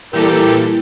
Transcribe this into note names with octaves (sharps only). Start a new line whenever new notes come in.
A#2 E3 G3 E4 G4 A4 A#4